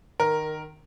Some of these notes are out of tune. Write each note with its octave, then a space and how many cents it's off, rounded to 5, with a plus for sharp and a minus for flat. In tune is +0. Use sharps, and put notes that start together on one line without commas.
D#3 -20 A#4 +0